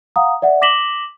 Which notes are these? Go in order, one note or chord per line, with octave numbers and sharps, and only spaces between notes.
F5 F#5 A#5 D#6
D5 E5 F#5
D6 A#6 B6 E7 F#7 G7